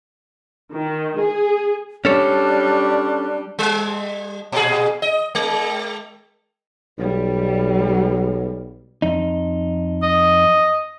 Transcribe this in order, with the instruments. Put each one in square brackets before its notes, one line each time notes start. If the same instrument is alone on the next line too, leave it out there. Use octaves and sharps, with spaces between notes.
[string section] D#3
G#4
[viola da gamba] G3 [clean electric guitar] C#4 A4 C#5 [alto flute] D4
[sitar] G3
A#2 G#4
D#5
G#3
[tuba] B1 [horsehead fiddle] G3
[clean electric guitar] F2 D#4
[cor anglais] D#5